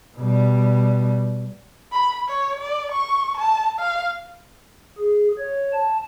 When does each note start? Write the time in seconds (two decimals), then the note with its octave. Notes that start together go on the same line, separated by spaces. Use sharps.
0.18 B2 G3
1.92 B5
2.28 C#5
2.60 D5
2.92 C#6
3.37 A5
3.79 F5
4.98 G#4
5.38 C#5
5.73 A5